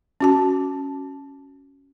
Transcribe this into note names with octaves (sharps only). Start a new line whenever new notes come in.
C#4 F#4 A5